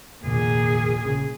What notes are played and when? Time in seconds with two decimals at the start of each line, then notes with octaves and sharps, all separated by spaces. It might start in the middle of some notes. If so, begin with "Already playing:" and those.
0.24 F1 A#1 D#2 A#2 G#4
1.03 A#1 C#3